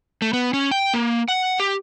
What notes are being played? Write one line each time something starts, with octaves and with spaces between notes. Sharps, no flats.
A3
B3
C#4
G5
A#3
F#5
G4